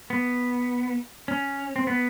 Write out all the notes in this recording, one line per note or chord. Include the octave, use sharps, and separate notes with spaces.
B3
C#4
C4
B3